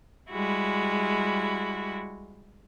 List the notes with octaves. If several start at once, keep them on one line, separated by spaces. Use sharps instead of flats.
G3 G#3 E4 F#4